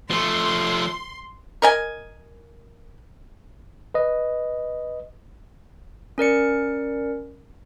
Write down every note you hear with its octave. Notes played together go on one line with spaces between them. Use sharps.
F3 A3 C6
A#4 D#5 G#5
B4 D#5
C#4 A#4 D5 C#7